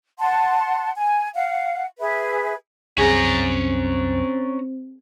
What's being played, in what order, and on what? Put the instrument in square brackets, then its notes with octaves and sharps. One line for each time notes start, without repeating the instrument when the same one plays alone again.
[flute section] F#5 A5 C6
G#5
F5 F#5
G#4 B4 E5
[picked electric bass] C2 F#2 [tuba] C4 [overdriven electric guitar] C#4 A#5 [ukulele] G#4